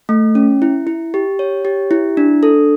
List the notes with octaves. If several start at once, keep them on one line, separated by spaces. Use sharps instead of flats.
A3
C#4
E4
E4
G4
C#5
G4
E4
D4
A4